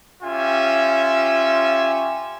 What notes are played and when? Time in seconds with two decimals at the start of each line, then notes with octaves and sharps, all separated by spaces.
0.23 C#4 F4 G4 E5 G#5